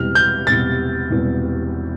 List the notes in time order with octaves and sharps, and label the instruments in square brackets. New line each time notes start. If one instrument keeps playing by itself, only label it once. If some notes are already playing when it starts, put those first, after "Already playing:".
Already playing: [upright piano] E1 E2 C3 E3 G3 [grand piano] F6
[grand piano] G6
[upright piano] E1 E2 C3 E3 G3 [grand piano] A6
[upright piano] E1 E2 C3 E3 G3